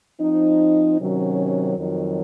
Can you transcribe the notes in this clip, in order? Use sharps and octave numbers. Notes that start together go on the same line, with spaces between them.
F3 C4 D#4
C3 D#3 F#3 C#4
F2 D#3 F#3